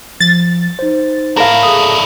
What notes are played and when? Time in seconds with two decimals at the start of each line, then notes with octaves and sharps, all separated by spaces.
0.20 F3 A6
0.79 D#4 C5
1.37 D4 E4 A#4 F5
1.63 G#4 A4 D#6